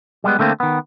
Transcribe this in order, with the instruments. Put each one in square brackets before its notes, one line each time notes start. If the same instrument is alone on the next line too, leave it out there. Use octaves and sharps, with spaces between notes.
[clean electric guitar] G3 G#3 B3
D3 A3 A#3 C4
D#3 B3